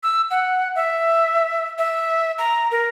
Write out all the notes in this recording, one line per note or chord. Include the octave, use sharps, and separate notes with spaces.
E6
F#5
E5
E5
A#5
A#4